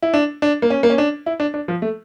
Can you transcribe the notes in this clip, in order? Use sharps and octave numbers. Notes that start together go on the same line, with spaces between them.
E4
D4
D4
A#3
C#4
A#3
C#4
D4
E4
D4
D4
F3
A3